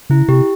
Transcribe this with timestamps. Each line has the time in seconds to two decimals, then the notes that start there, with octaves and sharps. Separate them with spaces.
0.10 C#3 E4
0.28 C3 G4